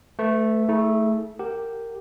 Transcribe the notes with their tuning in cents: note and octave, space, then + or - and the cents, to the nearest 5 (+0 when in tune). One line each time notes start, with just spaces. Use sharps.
A3 -5 B4 +30
A3 +0 E4 -45 G#4 +30
G4 +0 A#4 -20 F#5 +0